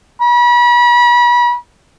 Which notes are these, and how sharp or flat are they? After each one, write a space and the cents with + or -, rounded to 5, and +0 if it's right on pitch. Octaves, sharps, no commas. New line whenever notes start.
B5 -35